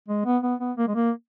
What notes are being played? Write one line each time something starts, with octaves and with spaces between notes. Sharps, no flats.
G#3
B3
B3
B3
A#3
G#3
A#3